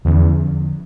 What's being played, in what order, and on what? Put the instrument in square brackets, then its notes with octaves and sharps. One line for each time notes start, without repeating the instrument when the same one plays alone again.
[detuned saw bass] E2 [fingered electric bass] D3 F3 A#3 C#4